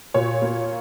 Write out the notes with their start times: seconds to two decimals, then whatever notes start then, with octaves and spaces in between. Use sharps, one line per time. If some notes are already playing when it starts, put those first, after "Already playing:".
0.14 A#2 C#5
0.42 A#3